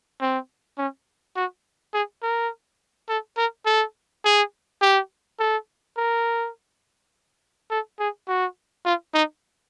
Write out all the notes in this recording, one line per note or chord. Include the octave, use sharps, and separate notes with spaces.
C4
C#4
F#4
G#4
A#4
A4
A#4
A4
G#4
G4
A4
A#4
A4
G#4
F#4
F4
D#4